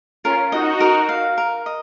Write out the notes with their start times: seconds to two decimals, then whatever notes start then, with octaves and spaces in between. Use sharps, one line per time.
0.24 C#4 F4 A#4
0.52 D#4 F#4 D#5
0.80 A#4
1.09 F5
1.38 A#4
1.66 D#5